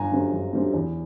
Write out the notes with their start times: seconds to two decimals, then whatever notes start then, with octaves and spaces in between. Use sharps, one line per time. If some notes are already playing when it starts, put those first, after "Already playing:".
Already playing: G1 G#5 A#5
0.12 F#2 D3 G3 C4
0.33 G1
0.53 F#2 D3 G3 C4
0.73 E2